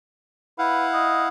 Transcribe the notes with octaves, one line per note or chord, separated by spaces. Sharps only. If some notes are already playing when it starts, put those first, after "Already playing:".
E4 B4 F5 F#5
D#5